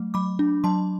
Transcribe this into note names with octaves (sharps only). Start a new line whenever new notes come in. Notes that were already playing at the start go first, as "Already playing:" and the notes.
Already playing: F#3 A3
F#3 B5 D6
D4
F#3 A5 C6